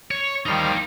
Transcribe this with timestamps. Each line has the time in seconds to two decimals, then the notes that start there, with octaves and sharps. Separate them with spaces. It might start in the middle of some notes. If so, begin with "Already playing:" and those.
0.11 C#5
0.46 D#3 F3 G3 D#4 F5